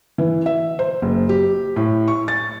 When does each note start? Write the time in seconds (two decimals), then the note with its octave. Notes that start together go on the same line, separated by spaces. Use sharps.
0.18 E3
0.46 E5
0.79 C5
1.02 F#1
1.29 G4
1.76 A2
2.08 C#6
2.28 A6